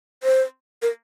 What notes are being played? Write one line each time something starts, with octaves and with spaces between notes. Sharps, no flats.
C5
A#4